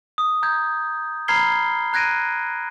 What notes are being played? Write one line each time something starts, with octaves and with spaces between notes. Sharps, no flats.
D#6
A#5 G6 G#6
A#5 B5 F6 G#6 C7 G7
G#6
A#5 F#6 G#6 A#6 D7 D#7